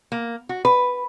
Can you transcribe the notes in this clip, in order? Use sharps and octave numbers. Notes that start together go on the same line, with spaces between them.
A#3
F#4
B4